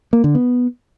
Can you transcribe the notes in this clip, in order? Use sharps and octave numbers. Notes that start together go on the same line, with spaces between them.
A#3
D3
B3